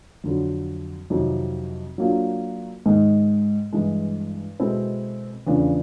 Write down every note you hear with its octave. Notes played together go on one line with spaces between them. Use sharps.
F2 D3 F#3
F2 C3 D#3 F#3
F#3 A#3 D4 F4
G#2 D#3 G#3
G2 E3 G#3
B2 G#3 C4 E4 A4
E2 C#3 F3 A3 D4